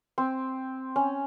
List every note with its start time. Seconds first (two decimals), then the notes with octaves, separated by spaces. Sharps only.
0.18 C4
0.96 C#4